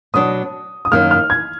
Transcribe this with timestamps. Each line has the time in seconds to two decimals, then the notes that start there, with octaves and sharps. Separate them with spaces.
0.14 B2 F#3 D4 D#6
0.85 D#6
0.92 F#2 D#3 A#3 F6
1.11 F6
1.30 G#6